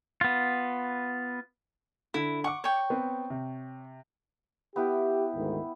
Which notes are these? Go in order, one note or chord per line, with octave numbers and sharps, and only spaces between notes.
B3 F4
D3 E4
F#5 C#6 D6
C#5 G5
B3 C4
C3
B3 E4 G4 G5
D2 G#2 D#3